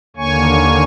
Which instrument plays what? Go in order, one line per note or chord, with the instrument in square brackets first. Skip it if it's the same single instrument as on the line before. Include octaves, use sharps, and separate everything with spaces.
[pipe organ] D#2 D3 A#3 C#5 G#5 C#6